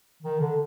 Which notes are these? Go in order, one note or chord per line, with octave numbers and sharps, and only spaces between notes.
D#3
D3